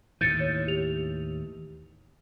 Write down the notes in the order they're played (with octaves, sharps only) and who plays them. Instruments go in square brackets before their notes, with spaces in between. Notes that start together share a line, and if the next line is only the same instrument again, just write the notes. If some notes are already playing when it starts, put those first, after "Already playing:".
[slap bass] D#2 A2 E3 [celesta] G6 A6 C#7
[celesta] C#5
G4 F7